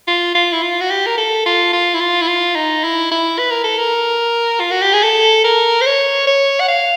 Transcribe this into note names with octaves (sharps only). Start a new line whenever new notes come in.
F4
F4
E4
F4
F#4
G4
A#4
A4
F4
F4
E4
F4
E4
F4
D#4
E4
E4
B4
A#4
A4
A#4
F4
F#4
G4
G#4
A4
A#4
C5
C#5
C#5
F#5
F5